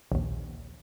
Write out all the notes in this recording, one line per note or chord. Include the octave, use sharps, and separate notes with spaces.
A#1 D#2